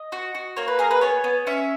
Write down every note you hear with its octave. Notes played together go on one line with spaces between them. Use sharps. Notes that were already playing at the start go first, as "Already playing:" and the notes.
Already playing: D#5
F#4
F#4
A#3 C#5
B4
G#4 A#4
B4
B3 C#5
B3
C#4 E5